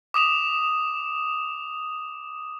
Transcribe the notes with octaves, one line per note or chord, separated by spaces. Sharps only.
D6 D#6 E7 F7